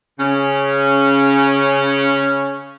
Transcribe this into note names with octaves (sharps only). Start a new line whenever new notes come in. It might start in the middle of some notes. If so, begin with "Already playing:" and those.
C#3 C#4